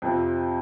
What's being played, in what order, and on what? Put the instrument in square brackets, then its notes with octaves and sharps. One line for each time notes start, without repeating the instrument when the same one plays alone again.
[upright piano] F2 C3 F3 C4